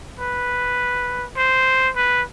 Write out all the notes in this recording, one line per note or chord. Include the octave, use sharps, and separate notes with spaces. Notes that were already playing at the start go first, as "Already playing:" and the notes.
B4
C5
B4